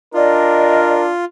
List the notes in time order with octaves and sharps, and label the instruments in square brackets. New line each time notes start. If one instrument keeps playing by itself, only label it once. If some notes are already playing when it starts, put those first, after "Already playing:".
[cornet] D4 [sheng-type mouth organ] F4 [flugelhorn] A#4 [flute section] D5 D#5